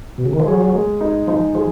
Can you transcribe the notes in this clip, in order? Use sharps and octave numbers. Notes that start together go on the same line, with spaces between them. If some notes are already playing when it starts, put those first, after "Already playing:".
B2
C#3
D#3
F3
F#3 G#4
G#3
D#4
F3 D#4
F3 G#4